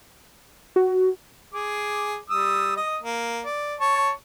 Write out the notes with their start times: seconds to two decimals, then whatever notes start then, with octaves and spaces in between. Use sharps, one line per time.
0.76 F#4
1.54 G#4 D6
2.30 G3 D#6 E6
2.77 D#5 D#6
3.03 A#3
3.45 D5
3.81 C#5 A5 C#6